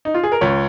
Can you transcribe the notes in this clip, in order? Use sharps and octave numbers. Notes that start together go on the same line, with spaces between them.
D#4
F4
G#4
A#4
C#2 C#5